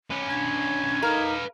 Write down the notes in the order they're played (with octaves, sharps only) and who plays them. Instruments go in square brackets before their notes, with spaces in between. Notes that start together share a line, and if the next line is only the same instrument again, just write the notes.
[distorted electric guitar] C#4 B4
[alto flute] D4 [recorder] G#6
[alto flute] D#4 [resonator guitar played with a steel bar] A#4 [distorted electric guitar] B4 F5